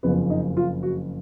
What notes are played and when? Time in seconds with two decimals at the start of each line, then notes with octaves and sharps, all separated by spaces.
0.03 F#1 F2 C#3 F3 B3
0.30 D#4
0.57 F4
0.83 F#4